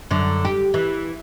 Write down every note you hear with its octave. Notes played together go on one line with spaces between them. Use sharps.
F#2 D3
G4
E3